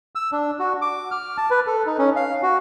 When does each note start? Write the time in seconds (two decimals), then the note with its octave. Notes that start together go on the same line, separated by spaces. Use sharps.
0.15 E6
0.32 D4
0.59 F#4
0.82 D6
1.11 F6
1.37 A5
1.50 B4
1.67 A4
1.86 D#4
1.98 C#4
2.16 F5
2.43 F#4